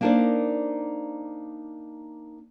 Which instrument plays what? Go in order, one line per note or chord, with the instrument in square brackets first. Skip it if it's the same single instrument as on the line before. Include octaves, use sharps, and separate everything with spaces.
[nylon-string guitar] A#3 D4 D#4 A#4 C5 D5